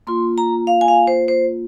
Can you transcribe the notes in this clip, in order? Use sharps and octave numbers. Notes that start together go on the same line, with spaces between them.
A#3 F4 C6
A#5
F5
G#5
F5
C5
C5